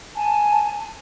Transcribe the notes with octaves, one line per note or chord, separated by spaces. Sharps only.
G#5 A5